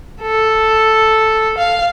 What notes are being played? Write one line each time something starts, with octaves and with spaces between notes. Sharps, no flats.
A4
F5